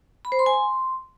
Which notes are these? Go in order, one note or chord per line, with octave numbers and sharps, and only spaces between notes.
B5
C5
C6
G#5
C6